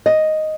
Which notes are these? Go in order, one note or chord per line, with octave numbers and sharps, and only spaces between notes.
D#5